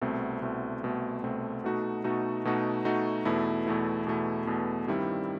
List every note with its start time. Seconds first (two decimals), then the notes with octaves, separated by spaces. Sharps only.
0.01 C2 B2 A3 C4
0.42 C2 B2 A3 C4
0.83 C2 B2 A3 C4
1.23 C2 B2 A3 C4
1.64 B2 A3 D#4 F#4
2.04 B2 A3 D#4 F#4
2.45 B2 A3 D#4 F#4
2.85 B2 A3 D#4 F#4
3.25 E2 B2 A3 E4
3.67 E2 B2 A3 E4
4.07 E2 B2 A3 E4
4.47 E2 B2 A3 E4
4.88 G2 D#3 G3 C4 E4